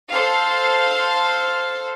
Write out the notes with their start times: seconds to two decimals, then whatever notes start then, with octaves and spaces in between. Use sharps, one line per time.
0.11 A4 C5 F5